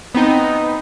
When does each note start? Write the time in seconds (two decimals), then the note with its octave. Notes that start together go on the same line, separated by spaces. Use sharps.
0.15 B3 C4 D#4